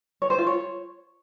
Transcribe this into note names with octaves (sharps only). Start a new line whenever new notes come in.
C#5
C5
F4
C#5